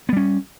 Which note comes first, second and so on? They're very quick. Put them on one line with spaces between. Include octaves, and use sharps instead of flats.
B3 G3 C#4